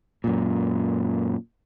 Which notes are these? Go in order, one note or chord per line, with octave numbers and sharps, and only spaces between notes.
F#2 A#2